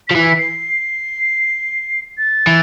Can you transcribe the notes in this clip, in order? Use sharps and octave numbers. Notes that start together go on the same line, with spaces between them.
F3 B6
E3
C7
A6
E3